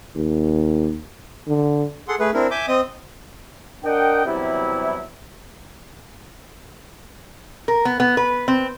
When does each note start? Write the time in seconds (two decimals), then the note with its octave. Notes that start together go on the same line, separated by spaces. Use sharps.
0.16 D#2
1.48 D3
2.08 G#4 A4 F#5 C6
2.20 A3 G#4 B4
2.34 C4 D4 E4 A#4
2.51 E5 G#5 D6 G6
2.68 C4 D#5 D#6
3.84 D4 A#4 D#5 F#5 G5
4.26 E2 C3 F#3 G3 E4
7.68 A#4
7.85 B3
8.00 B3
8.17 B4
8.48 C4